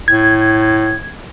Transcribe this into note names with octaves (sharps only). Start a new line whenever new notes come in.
A2 G#6